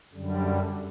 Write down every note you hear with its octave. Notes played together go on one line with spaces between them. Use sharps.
F#2 D3 G3